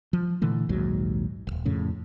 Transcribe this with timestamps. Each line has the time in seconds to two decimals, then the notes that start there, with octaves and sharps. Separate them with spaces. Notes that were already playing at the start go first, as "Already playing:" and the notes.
0.13 F3
0.42 A#2 D3 E3 A3
0.69 A#1 D#2 G#2 F#3
1.47 D#1 G#1
1.65 F2 A2 C#3